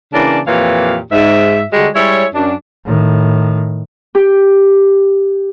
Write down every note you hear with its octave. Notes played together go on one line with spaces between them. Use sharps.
C#3 E3 A#3 C#4 D4 D5
F2 A#2 E3 G4 C#5 F5
G#2 E5
D3 G3 G#3 F#4
G3 G#3 E4 C#5
F#2 D4
A2 D#3
G4